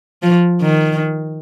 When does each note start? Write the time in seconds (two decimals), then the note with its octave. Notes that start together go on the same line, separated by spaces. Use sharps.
0.23 F3
0.62 D#3